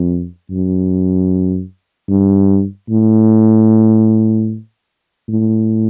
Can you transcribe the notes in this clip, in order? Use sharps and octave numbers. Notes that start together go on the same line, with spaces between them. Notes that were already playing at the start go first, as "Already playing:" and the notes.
Already playing: F2
F#2
G2
A2
A2